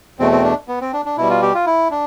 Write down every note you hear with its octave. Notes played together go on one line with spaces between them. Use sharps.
E2 B2 A3 C4
C4
D4
B3
C4
D4
D4
B2 G3 E4
F4
G4
F4
E4
D4